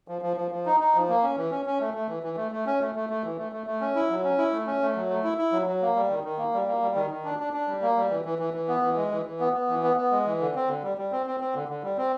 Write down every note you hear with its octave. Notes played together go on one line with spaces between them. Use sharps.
F3
F3
F3
F3
D#4
D#4
F3
A#3
C#4
E3
C#4
C#4
A3
A3
E3
E3
A3
A3
C#4
A3
A3
A3
E3
A3
A3
A3
C#4
E4
F#3
C#4
E4
A3
C#4
A3
F#3
A3
E4
E4
F#3
F#3
A#3
G3
D#3
D#3
A#3
G3
A#3
G3
D#3
D#3
D4
D4
D4
G3
A#3
G3
E3
E3
E3
E3
B3
E3
G#3
E3
E3
B3
B3
E3
B3
B3
G#3
E3
D3
C4
D3
G3
G3
C4
C4
C4
D3
D3
G3
C4